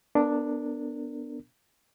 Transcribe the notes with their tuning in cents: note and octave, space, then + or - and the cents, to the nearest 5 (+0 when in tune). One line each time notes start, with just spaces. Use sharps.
B3 +0 D4 +0 A#4 -30